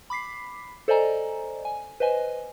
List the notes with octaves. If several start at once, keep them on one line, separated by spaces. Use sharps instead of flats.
B5 D6 B6 C7
A4 C5 D5 D#5 G#5 A#5
G#5
B4 C5 D#5 G#5